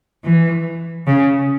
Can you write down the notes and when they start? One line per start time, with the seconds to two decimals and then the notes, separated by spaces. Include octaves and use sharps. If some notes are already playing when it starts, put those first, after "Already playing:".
0.24 E3
1.06 C#3